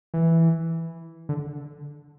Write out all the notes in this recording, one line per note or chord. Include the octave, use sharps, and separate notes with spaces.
E3
D3